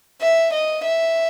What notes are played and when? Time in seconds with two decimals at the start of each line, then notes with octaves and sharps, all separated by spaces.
0.22 E5
0.52 D#5
0.84 E5